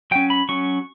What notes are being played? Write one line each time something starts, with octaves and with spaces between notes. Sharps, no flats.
F#3 C#4 G5
B5
F#3 C#4 C#6